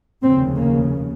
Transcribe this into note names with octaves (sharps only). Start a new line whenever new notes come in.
F1 D#2 C#3 C4
A#3